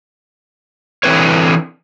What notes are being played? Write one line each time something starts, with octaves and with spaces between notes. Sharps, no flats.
D3 E3 C4 B4 C#5